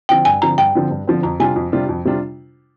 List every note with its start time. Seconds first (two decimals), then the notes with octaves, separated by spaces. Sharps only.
0.09 D3 F3 C4 G5
0.25 G2 G#5
0.42 D3 F3 C4 A#5
0.58 G2 G5
0.75 D3 F3 C4
0.91 G2
1.07 D3 F3 C4
1.23 F2 A#5
1.40 C3 G3 D4 F4 G#5
1.56 F2
1.72 C3 G3 D4 F4
1.89 F2
2.05 C3 G3 D4 F4